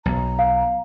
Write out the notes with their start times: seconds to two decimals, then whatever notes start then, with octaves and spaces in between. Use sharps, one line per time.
0.06 B1 A#5
0.39 F5